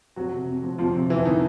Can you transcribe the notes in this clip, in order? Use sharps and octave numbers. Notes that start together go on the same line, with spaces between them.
F2 F#3 F#4
C3
F2
F3
F2 F3 F4
C3
F2 E3 E4
D#3 D#4